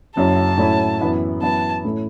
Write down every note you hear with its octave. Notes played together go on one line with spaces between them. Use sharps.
F#1 F#2 F#3 C#4 E4 A5
A2 F#3 C#4 E4
F#2 E3 B3 E4
F#2 E3 B3 E4 A5
A2 A3 C#4 E4